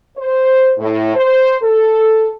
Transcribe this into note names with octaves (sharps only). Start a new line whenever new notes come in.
C5
A2
C5
A4